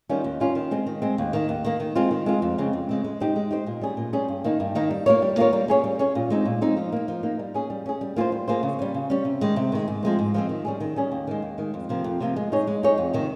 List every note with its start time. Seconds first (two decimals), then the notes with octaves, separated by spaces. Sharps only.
0.09 D#3 G3 C#4 F4
0.24 D#2
0.40 D#3 G3 C#4 F4
0.55 D#3
0.71 G#3 C4
0.87 D#3
1.02 G#3 C4
1.18 D#2
1.33 D#3 A#3
1.49 D#2
1.65 D#3 A#3
1.80 D#3
1.95 G#3 C4 F4
2.11 D#3
2.26 G#3 C4 F4
2.42 F2
2.58 C#3 G#3 C4
2.73 F2
2.89 C#3 G#3 C4
3.04 G#3
3.20 D#4 G4 C5
3.36 G#3
3.51 D#4 G4 C5
3.66 A#2
3.81 G3 C#4 G#4
3.97 A#2
4.13 G3 C#4 G#4
4.29 G2
4.44 D#3 A#3 D#4
4.60 G2
4.75 D#3 A#3 D#4
4.91 G3
5.06 A#3 F4 A#4 C#5
5.22 G3
5.37 A#3 F4 A#4 C#5
5.53 G3
5.68 C#4 G#4 C#5
5.84 G3
5.99 C#4 G#4 C#5
6.15 A#2
6.30 G#3 C4 D#4
6.45 A#2
6.62 G#3 C4 D#4
6.77 F3
6.92 A#3 D#4
7.08 F3
7.23 A#3 D#4
7.39 G3
7.54 C#4 G#4
7.70 G3
7.86 C#4 G#4
8.01 G3
8.16 A#3 F4 G#4 C5
8.32 G3
8.48 A#3 F4 G#4 C5
8.63 C#3
8.79 G3 C#4
8.94 C#3
9.10 G3 C#4
9.25 C3
9.41 D#3 G#3
9.56 C3
9.72 D#3 G#3
9.88 G#2
10.03 F3 G#3 C4
10.19 G#2
10.34 F3 G#3 C4
10.49 D#3
10.65 G3 C#4 G#4
10.80 D#3
10.96 G3 C#4 G#4
11.12 D#2
11.27 D#3 G#3
11.42 D#2
11.58 D#3 G#3
11.74 F2
11.89 C3 F3 A#3
12.04 F2
12.20 C3 F3 A#3
12.36 G#3
12.52 D#4 G#4 C#5
12.67 G#3
12.83 D#4 G#4 C#5
12.98 F2
13.14 C3 D#3